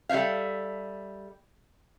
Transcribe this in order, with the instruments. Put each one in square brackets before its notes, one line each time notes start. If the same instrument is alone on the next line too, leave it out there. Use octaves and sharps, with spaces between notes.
[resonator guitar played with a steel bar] G3 A4 C5 E5 F5